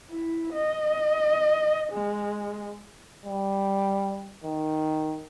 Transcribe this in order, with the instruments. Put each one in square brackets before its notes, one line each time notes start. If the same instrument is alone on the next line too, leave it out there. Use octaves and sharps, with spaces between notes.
[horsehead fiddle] E4
D#5
G#3
[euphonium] G3
D#3